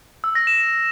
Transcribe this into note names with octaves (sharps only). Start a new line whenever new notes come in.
E6
A#6
E7